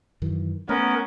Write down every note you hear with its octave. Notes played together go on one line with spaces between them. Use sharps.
F#2 D#3 E3
A3 B3 C#4 A#4